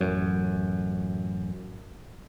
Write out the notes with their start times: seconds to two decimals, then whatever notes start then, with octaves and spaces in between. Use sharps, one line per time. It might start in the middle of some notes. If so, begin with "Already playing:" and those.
0.01 A1 F#2